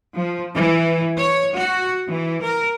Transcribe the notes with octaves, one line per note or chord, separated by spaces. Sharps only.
F3
E3
C#5
F#4
E3
A#4